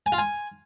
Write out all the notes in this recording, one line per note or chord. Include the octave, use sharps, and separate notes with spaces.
G#5
F4
G#5